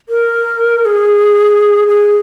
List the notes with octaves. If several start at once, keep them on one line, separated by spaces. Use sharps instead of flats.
A#4
G#4
G#4